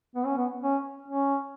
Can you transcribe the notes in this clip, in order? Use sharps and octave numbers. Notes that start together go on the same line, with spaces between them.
B3
C#4
B3
C#4
C#4